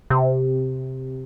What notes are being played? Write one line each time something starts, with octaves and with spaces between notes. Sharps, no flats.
C3